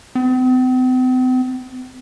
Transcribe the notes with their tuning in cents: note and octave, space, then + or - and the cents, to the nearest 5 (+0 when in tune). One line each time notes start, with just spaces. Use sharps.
C4 -45